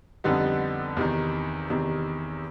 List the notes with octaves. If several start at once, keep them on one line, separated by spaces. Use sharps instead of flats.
F2 D3 G3 B3 D#4
E2 C3 D#3
E2 C3 D#3